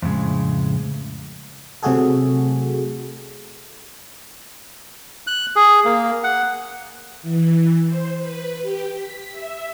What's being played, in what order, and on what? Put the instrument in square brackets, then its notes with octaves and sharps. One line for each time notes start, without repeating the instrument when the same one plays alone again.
[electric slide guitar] F2 A2 C#3 G#3
[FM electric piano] C3 F#3 A3 F#4 G#4 A4
[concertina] F#6
G#4
A#3
F#5
[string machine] E3
C5
B4
G4
B6
E5